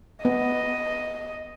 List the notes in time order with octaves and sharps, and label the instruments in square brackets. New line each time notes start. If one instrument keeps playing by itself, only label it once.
[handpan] B3 [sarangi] D#5